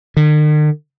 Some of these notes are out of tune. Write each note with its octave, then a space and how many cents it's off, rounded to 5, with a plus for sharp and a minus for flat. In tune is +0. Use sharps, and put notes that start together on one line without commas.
D#3 -45